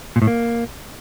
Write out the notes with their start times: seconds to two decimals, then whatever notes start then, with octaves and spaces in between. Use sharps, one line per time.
0.16 A#2
0.22 A2
0.27 A#3